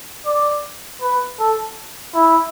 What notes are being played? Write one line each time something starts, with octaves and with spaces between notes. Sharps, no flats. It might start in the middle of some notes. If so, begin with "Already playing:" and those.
D5
B4
A4
E4